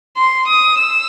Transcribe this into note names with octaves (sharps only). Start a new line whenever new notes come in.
C6
D#6
E6